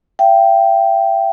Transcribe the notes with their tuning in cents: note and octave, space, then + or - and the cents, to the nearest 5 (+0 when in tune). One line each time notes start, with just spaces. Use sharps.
E5 +40 G5 -10